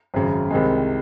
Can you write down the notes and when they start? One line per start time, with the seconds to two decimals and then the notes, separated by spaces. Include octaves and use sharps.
0.14 G#1 F#2 C#3
0.51 C2 C3 D#3 G#3